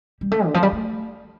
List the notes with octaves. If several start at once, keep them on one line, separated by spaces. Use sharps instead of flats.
G3
A3
D3
F3
G3
A3